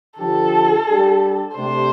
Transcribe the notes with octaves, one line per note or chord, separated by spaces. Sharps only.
D3 F3 D4 G4 A4
G3 D4 G4
C3 A3 D4 G4 C5